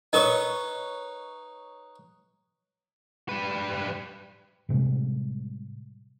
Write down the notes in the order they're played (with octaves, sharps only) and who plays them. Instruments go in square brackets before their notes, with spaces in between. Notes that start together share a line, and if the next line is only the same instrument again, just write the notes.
[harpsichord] D#4 B4 C#5 [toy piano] A#4 D#5
[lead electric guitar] G3 B4
[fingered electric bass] A2 C3 G3 G#3